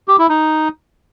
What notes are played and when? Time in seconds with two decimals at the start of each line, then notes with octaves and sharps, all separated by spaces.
0.08 G4
0.19 E4
0.29 D#4